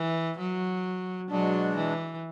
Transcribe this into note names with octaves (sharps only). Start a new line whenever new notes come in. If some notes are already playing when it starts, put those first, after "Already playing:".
Already playing: E3
F#3
B2 F#3 G#3 D4
E3